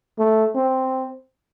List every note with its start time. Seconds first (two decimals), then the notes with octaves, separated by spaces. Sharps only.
0.19 A3
0.55 C4